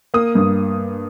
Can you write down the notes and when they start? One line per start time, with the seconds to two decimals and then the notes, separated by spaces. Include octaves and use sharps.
0.14 A#3 D#6
0.35 G2